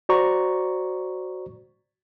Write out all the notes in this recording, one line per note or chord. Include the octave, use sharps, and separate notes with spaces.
F#4 C5 D5 A#5 C#6